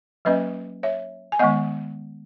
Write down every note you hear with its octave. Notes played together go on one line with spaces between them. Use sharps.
F#3 A#3 C#4 B4 D#5
C#5 E5
G#5
D#3 G#3 B3 D#5 F#5